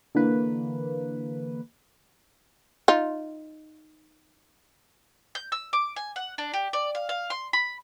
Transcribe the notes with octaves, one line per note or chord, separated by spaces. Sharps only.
D3 E3 A#3 B4
D#4 F4
G6
E6
D6
G#5
F#5
D4
G4
D5
F5
F5
C6
B5